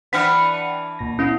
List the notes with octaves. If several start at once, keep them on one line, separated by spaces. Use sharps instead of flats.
E3 D4 B4 F#5 G5 F6 B6 C#7
D2 A#2 A#6
B3 C#4 E4